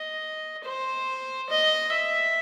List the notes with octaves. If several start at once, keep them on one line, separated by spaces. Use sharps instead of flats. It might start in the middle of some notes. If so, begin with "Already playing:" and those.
Already playing: D#5
C5
D#5
E5